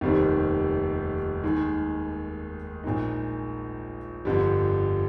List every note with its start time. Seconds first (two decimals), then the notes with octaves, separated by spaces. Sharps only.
0.01 F1 D#2 D#3 G3 C4
1.44 D#2 D#3 G#3 D#4
2.84 A#1 A#2 G#3 D#4
4.25 G1 F2 D3 G3